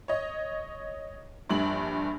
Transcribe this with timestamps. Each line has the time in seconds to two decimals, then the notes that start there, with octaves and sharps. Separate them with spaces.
0.08 C#5 D#5
1.49 A#1 G2 F#7